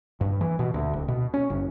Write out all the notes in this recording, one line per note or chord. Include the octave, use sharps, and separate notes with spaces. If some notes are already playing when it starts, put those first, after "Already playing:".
G2
E3
B2
D2
D1
B2
C#4
F#1